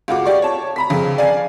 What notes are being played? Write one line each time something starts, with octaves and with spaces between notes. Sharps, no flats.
C#2 F4 F#4 D6
G4 D5 C#6
C#5 A5
A#5 B5 B6
F2 C#3
D5 F5 G#5